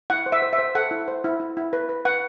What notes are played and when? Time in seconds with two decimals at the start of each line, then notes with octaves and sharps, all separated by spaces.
0.10 E4 F#5
0.26 C5
0.32 E5
0.42 C5
0.53 E5
0.58 C5
0.75 A4 F#5
0.91 E4
1.08 C5
1.24 E4
1.40 E4
1.57 E4
1.73 B4
1.89 B4
2.05 B4 F#5